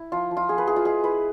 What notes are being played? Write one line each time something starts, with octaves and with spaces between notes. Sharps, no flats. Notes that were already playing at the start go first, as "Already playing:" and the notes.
Already playing: E4
F3 F4
F3
F4
B3 G#4
B4
E4 G#4
F4
G#3 G#4
E4 B4